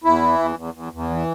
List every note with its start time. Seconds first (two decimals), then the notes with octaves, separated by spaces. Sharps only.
0.04 E2 E4
0.21 E3
0.39 E2
0.56 E2
0.74 E2
0.93 E2
1.10 E3